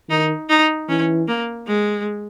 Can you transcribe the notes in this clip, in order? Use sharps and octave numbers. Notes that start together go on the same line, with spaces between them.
D#3 D#4
D#4
E3 C#4
A#3
G#3